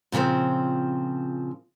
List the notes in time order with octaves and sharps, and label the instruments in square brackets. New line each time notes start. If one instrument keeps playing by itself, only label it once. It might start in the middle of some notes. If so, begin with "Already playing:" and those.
[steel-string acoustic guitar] A#2 C#3 E3 F3 C4